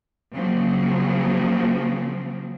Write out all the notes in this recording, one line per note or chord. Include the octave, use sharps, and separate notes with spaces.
C#3 F3 F#3 A#3 C4